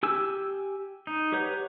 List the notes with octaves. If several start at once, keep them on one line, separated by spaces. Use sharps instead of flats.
G4 G#5 E6
D#4
G4 B4 C#5 F#5 G6